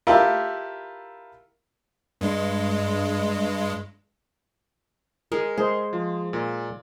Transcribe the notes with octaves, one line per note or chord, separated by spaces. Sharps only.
E4 F4 G4 A4 A#4
G2 G#3
G#3 A#4
G#3 C5
F3
A#2